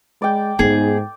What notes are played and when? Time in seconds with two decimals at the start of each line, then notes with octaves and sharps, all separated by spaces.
0.22 G#3 D5 G5
0.59 G#2 B3 D#4 G#4